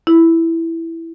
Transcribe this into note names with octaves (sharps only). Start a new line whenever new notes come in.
E4